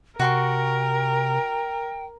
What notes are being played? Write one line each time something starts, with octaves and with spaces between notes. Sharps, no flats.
C3 F#4 A#4 G5 C6 C#6